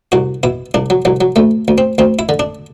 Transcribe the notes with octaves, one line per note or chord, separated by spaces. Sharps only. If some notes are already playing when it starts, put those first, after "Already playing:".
C2 F#4
B2 E4
C2 D4
F#3
C2 F#3
F#3
D2 A3
D2
C4
D2 C4
E4
D3
D4